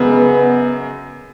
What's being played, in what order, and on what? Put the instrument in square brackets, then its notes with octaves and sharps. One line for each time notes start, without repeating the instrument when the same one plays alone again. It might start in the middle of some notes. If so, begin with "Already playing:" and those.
Already playing: [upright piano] F#2 C#3 G#3 [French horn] B3